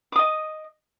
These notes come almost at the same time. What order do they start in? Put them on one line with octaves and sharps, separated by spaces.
D6 D#6 D#5